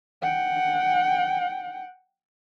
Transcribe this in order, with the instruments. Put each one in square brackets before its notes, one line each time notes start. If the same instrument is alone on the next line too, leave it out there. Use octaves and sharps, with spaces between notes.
[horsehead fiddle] F#5 G5